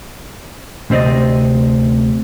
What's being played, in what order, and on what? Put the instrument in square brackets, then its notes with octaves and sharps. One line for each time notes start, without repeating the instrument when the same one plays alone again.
[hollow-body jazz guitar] D2 C3 C4 D5 D#5